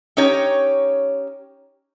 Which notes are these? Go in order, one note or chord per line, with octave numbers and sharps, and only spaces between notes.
C#4 D#4 G4 C#5